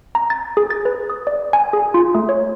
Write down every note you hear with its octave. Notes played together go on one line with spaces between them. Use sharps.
A#5
A6
G#4
A6
B4
D#6
D5
G#5
G#4
F4
A3
C#5